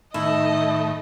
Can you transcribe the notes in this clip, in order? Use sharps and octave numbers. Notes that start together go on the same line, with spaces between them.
A2 D#3 A3 D#4 E4 D#5